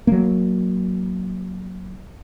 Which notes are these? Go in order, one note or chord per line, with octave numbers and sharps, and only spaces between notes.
F#3 A#3